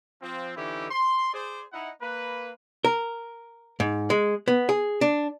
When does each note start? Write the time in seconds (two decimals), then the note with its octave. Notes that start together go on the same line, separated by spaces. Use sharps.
0.22 F3 C4
0.56 D3 E3 C#4 D#4 E4 G4
0.91 C6
1.33 G#4 C5 D5
1.72 D#4 E4 F#5
2.02 A#3 B4
2.84 A#4
3.80 G#2
4.10 G#3
4.48 B3
4.69 G#4
5.01 D4